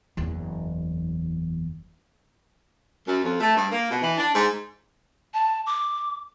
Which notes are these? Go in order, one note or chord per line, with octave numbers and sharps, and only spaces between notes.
F#1 E2
F#2
F2
A3
G2
A#3
B2
E3
D4
G#2
A5
D6